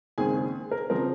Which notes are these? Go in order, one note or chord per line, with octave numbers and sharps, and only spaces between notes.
D#2 C#3 G#3 C4 G#4 G#5
A#4
C#3 F3 C4 A#4